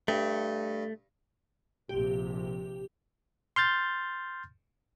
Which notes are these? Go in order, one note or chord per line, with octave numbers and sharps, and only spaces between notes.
G2 A3
A#1 C3 G4
C6 F6 G6 A6